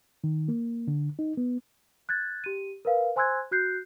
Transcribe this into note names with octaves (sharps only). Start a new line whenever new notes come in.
D#3
A#3
D3
D#4
B3
F#6 G#6 A6
G4 D#7
A#4 B4 F5
C5 G#5 C6 E6 F#6 G#6
F#4 F#6 G6 C7